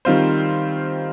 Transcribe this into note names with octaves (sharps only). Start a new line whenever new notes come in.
D#3 G3 C4 F4 C5